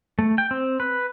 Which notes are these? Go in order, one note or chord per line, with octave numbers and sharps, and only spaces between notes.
A3
G5
C4
B4